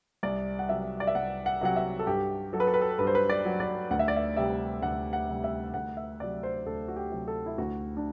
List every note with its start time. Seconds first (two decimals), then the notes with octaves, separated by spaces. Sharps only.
0.23 C2 D5
0.59 F#5
0.69 C3 F#3 E5
1.00 D5
1.07 E5
1.15 C2 F#5
1.46 F#5
1.61 C3 F#3 F#5
1.76 E5
1.99 A4
2.07 G2 G4
2.53 F#3 A4
2.60 B4
2.67 A4
2.74 B4
2.81 A4
2.99 G2 B4
3.07 C5
3.15 B4
3.29 D5
3.45 F#3
3.60 D5
3.91 D2 F#5
3.99 E5
4.08 D5
4.16 E5
4.36 C3 G3 E5
4.82 D2 F#5
5.13 F#5
5.29 C3 G3
5.44 E5
5.74 D2 F#5
5.97 E5
6.20 C3 F#3 D5
6.43 C5
6.66 D2 A4
6.88 F#4
6.96 G4
7.12 C3 F#3
7.28 A4
7.46 E4
7.58 D2 F#4
7.97 D4